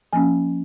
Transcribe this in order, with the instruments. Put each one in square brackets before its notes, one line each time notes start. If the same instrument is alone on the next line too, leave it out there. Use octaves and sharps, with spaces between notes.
[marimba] F3 A#3 C#4 G#5